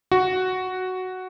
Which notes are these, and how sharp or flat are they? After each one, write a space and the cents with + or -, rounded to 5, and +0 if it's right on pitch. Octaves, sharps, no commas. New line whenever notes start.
F#4 +5